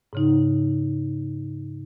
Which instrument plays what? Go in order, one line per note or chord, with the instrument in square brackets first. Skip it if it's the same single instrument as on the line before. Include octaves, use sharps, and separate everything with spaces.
[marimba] G#2 C#3 D#4